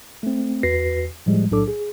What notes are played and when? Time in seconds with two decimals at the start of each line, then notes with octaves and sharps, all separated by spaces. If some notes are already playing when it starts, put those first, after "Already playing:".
0.23 A3 C4
0.63 E2 F#4 B4 A#6 C7
1.26 A2 F3 G3 G#3
1.50 B1 A2 F#3 D4 A4 D6
1.68 G#4